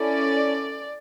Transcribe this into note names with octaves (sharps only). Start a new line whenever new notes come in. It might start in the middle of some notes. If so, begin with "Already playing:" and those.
Already playing: C#4 E4 A4 D5